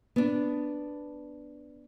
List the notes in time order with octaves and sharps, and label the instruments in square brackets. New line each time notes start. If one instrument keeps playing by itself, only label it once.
[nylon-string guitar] B3 D4